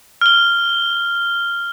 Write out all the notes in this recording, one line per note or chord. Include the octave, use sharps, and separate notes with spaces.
F6 G7